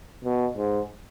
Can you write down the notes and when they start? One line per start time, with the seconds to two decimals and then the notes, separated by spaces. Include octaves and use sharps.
0.24 B2
0.57 G#2